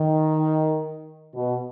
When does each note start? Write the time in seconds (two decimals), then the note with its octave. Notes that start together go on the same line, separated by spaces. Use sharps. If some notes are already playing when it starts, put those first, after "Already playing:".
Already playing: D#3
1.35 B2